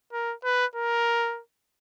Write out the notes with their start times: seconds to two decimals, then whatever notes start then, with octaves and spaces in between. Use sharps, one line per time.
0.13 A#4
0.44 B4
0.76 A#4